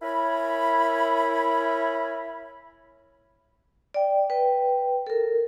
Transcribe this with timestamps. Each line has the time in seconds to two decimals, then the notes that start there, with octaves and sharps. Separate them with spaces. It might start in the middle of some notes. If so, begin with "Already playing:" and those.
0.02 E4 A#4 C#5 G#5 B5
3.94 D5 G5
4.30 B4 G5
5.07 A4 A#4